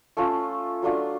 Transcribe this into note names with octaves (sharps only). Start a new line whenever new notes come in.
A3 C#4 F4 A4
F#3 A3 D4 F4